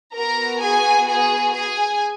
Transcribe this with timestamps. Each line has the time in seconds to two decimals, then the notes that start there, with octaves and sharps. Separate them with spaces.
0.15 B3 F#4 A#4 A#5
0.61 G#4 G#5
1.08 G#4 G#5
1.53 G#4 G#5